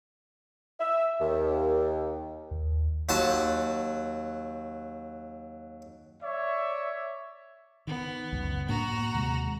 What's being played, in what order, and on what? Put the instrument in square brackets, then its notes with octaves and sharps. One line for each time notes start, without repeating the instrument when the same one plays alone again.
[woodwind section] E5
D#2
[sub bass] D#2
[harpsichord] D#2 F#3 F#4 A5 C6
[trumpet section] C#5 D5 E5
[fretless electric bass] D#3 [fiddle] B3
[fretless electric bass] C#2 F#2
[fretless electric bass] A2 A#3 D4 [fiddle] F#4 A#5
[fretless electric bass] D#2 C3 G#3